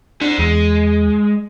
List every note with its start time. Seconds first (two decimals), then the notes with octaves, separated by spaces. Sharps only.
0.22 D4 C5 F#5
0.38 E2 G#3